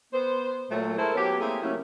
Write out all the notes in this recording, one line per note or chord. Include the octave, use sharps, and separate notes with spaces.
B3 C5
A#2 F#3 A3
G#3 A3 E4 A4 A#4 C5
F#3 B3 C#4 G4
A3 A#3 C4 E4 G#4
C#3 F#3 A3 A#3 C#4 E4